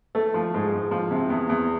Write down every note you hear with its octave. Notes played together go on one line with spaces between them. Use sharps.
A3
F3
G#2
G#2
F3
C3
E2
E2